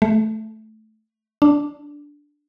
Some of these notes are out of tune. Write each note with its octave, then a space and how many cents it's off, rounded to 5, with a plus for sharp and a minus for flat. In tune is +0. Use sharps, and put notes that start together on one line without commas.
A3 -10
D4 -5